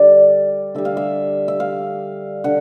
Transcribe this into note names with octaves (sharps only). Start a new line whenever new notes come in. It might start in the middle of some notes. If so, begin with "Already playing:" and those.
Already playing: D3 G3 D5
D3 G3 E5
F5
E5
E5
F5
D3 F#5